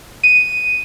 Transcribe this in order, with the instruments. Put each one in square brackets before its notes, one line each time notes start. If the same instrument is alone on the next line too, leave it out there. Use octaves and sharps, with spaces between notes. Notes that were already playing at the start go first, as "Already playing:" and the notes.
[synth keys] D#7